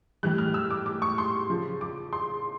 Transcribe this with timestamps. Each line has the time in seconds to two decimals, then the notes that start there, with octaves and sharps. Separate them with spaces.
0.23 A2 E3 G3 F#6
0.38 F6
0.54 E6
0.70 D6
0.86 D6
1.02 C#6
1.18 C6
1.50 C#3 F3
1.81 D6
2.13 C6